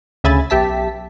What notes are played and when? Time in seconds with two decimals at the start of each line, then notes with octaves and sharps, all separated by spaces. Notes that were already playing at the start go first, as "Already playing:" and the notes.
0.24 D2 C#3 E5 G#5 B5 A6
0.50 B1 G4 E5 A5 B6